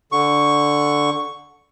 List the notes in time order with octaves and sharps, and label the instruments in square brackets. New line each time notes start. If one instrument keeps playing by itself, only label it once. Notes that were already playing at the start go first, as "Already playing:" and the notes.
[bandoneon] D3 C#6